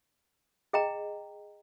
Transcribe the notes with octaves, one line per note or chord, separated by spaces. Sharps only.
G#4 D#5 G5 A#5